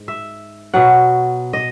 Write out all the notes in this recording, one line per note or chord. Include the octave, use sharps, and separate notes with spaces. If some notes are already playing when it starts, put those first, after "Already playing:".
Already playing: G#2
E5
B2 F#3 F#5
D#5